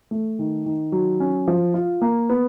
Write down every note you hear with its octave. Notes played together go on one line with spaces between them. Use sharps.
A3
D#3
D#3
F#3
C#4
F3
F4
A#3
B3